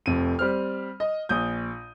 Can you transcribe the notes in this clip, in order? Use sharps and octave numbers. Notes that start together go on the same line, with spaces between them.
F1 F2 D#7
G3 C4 F6
D#5
A#1 D#6 G6